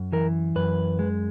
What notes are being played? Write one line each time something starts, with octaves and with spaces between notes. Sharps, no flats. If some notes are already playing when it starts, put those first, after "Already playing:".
Already playing: F#2
E3 A#4
F#2 B4
G#3